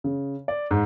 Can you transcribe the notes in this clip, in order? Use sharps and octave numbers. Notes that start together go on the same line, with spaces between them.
C#3
D5
G#2